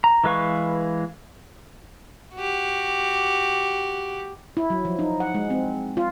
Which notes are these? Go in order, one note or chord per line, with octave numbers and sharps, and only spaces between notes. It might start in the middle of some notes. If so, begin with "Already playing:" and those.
A#5
E3 G#3 B4 F5 C#6
F#4 G4
E4
F#3
F3
D#4
F#5
G#3
C4
F4